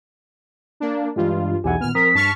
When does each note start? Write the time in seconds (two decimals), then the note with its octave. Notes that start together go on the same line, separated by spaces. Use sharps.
0.80 A#3 D4
1.16 G2 E3 G#3 F4
1.64 B1 E2 E3 G4 F#5 G#5
1.81 A#2 D#3 B3 F6
1.95 F3 C4 A#4 D#6 B6
2.15 G2 A5 C#6 F6